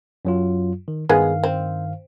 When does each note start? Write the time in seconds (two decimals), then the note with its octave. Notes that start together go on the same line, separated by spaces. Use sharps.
0.25 F#2 F#3 F4
0.88 D#3
1.09 G2 D#3 G#3 B3 F5
1.44 C4